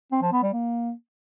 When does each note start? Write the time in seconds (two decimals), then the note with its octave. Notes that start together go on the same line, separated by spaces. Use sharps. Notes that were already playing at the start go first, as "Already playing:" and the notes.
0.12 C4
0.22 F3
0.32 B3
0.43 G3
0.53 A#3